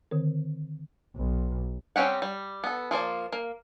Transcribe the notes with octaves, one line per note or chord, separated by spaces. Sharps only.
D3 D#3 C4 A#4
B1
G3 C4 C#4 G4 F#5
G3
B3 A4
F3 A#3 F4 D5
A#3